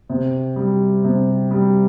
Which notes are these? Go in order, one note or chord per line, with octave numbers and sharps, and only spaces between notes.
C3
G3
C3
G3